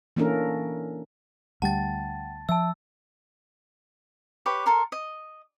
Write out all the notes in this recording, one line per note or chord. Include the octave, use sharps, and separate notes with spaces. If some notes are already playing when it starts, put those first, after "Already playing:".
E3 A#3 C#4 D4 A4 A#4
D2 G3 F#5 G5 A5 A6
F3 E5 A5 E6
G4 B4 C#5
A4 A#4 C6
D#5